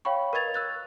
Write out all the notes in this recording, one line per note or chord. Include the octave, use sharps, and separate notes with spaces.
C#5 F5 G5 B5 C#6
A#4 B4 D#5 G#6 A6 F7
E6 F#6 A6